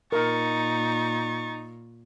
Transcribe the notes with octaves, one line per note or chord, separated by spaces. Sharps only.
A#2 D#4 A#4 C#6 A6